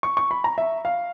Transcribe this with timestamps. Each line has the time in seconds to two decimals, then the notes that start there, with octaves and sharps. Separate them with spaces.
0.03 C#6
0.17 C#6
0.31 B5
0.44 A#5
0.58 E5
0.85 F5